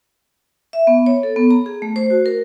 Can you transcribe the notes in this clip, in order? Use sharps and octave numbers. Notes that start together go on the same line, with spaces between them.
E5
B3
C#5
A4
B3
A#5
G#4
A3
C5
F#4
A#4